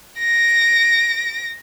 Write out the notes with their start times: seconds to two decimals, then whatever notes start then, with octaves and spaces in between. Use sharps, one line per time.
0.18 A#6 D7